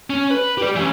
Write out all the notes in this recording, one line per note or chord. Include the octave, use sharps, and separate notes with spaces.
C#4
B4
G4 D5
E3 C#4